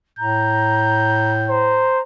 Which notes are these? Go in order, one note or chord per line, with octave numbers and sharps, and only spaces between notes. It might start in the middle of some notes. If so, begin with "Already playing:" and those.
A2 A#5 G6
C5 A#5